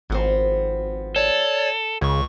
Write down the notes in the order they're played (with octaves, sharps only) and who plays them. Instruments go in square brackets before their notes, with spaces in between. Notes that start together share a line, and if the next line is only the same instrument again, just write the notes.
[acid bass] G#1 [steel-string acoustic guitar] F3 B3 C4
[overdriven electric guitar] A4 [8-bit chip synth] C#5 D5
[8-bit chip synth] C#2 C#6 [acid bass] C#3 [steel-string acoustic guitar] C#4